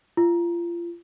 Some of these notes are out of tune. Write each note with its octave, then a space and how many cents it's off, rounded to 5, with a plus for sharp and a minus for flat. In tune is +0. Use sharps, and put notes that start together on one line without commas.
F4 -30